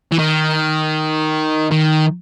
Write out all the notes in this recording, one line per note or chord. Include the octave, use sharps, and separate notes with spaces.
E3
D#3
D#3